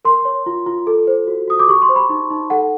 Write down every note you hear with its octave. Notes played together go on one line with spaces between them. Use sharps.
A#4 C6
C#5
F4
F4
A4
C5
F#4
F#4 D#6
D6
G4 C#6
C6
C5
B5
D#4
D#4
A4 F#5